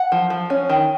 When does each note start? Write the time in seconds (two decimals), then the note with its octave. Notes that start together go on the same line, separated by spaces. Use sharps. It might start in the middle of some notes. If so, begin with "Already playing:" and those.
Already playing: F#5
0.12 F3
0.30 F3
0.50 C#4
0.69 D#3